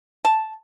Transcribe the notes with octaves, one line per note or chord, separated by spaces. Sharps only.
A5